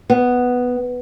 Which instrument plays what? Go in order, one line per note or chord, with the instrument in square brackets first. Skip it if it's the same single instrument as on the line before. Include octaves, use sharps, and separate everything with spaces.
[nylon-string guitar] B3